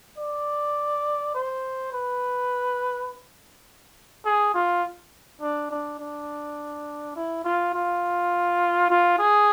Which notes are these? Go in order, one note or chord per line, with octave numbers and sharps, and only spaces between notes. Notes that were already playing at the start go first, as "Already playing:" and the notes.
D5
C5
B4
G#4
F4
D4
D4
D4
E4
F4
F4
F4
G#4